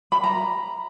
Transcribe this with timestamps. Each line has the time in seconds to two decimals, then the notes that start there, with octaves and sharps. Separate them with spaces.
0.12 B5
0.23 A#5